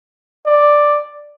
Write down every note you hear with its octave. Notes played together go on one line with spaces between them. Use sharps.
D5